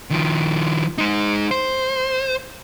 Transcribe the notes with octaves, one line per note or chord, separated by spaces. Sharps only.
D#3 F3
G#3 D#4
C5